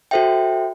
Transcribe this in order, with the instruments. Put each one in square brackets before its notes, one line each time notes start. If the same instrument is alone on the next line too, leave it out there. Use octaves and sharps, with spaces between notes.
[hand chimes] F#4 A4 C5 E5 G5